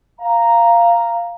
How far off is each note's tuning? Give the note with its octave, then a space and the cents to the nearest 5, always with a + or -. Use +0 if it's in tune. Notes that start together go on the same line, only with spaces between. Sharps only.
F5 -10 A#5 +0